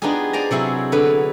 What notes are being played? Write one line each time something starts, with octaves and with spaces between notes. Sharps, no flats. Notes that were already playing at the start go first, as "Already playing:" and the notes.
B3 D4 D#4 F4 G4 G#4
C5 D5 G#5 A#5
C3 F#3 E4 G#4
D3 B3 B4